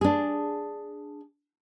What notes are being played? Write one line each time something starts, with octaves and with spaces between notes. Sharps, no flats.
D4 G#4